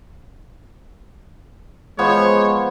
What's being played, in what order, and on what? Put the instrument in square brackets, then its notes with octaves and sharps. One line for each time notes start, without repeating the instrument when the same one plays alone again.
[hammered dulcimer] F3 B3 C5 [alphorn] G#3 [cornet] C#5